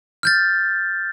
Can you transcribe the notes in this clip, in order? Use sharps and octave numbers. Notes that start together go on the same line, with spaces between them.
F6 G6 A6